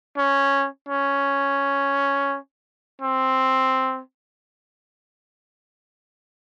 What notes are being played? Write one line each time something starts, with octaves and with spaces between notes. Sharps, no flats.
C#4
C#4
C4